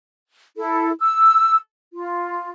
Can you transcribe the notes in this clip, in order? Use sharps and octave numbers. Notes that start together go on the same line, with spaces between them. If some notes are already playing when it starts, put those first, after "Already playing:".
E4 A4
E6
F4